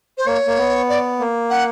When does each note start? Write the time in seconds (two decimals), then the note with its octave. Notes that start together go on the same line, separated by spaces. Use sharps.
0.17 C5
0.26 A#3 C#5
0.47 A#3
0.58 B3
0.88 D5
1.20 A#3
1.49 F#5